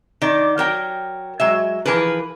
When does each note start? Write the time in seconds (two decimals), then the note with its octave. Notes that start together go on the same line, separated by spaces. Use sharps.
0.22 D#3 D5
0.58 F#3 A#4 G5
1.40 F#3 G#3 E5
1.85 E3 F3 G#4 A#4 B4